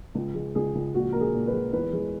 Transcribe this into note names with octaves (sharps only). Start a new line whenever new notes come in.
C#2
G#3
C#2 G#4
C#2
A#1 F#4
A#1 A#4
G#4
A#2
B4
G#3
E2 B4
G#3